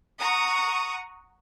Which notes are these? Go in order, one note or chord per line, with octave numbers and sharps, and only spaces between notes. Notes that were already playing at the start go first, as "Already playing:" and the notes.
F#5 A#5 C#6 D#6